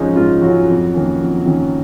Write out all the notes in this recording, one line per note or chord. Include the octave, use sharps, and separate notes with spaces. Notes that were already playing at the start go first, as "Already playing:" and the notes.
Already playing: G#2 F3 G#3 C#4 D#4
G#2 F4
F3 F#3 G#3 C#4 F#4
F2
D#3 A#3 C#4
F2
D#3 A#3 C#4